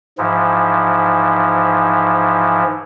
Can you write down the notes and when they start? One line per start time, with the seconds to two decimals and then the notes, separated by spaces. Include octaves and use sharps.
0.18 G#2 E3 F3